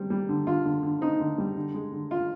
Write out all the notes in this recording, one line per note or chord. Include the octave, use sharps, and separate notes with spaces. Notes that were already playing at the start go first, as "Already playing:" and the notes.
Already playing: G3 C4
G3
D3
D3 F4
D3
D3
C4 D#4
D3
G3
D3
G#3
D3
F4